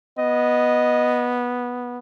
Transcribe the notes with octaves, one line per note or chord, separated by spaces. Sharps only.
B3 D#5